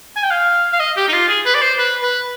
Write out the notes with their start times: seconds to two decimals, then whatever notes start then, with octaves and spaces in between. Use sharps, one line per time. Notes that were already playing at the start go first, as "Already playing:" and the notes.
0.16 G#5
0.23 G5
0.31 F5
0.72 F5
0.80 D#5
0.97 G4
1.08 D#4
1.13 F4
1.28 G#4
1.45 B4
1.55 D5
1.61 C5
1.78 B4
2.03 B4